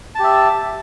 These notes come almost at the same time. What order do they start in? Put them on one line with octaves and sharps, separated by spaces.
A5 G4 E5